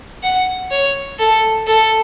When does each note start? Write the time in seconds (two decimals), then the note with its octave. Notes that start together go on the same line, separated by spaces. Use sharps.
0.23 F#5
0.71 C#5
1.19 A4
1.67 A4